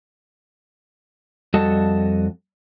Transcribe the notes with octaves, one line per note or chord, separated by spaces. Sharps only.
F2 G3 F#4 A4 D#5 A5